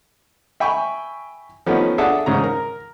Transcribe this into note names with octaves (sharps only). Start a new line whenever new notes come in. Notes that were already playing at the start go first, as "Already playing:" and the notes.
E5 G5 G#5 B5 C#6
F3 A3 B3 C#4 D#4 G4
D4 G#4 A4 E5 F#5 A5
G#2 C#3 G#3 A#5
A#4